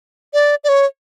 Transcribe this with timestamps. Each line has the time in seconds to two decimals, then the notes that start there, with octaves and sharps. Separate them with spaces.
0.34 D5
0.64 D5
0.69 C#5